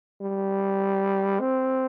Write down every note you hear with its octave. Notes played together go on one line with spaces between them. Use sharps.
G3
C4